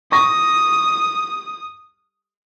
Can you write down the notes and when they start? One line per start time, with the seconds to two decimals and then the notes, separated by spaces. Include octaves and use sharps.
0.12 C#6 D#6 A#6